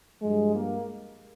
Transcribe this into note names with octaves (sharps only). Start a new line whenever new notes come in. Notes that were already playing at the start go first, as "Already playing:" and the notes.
G2 F3 G#3
A#3